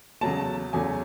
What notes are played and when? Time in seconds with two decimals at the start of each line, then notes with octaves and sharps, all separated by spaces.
0.21 E2 C#3 F#3 A3 A5
0.73 E2 C#3 F#3 A3 G#5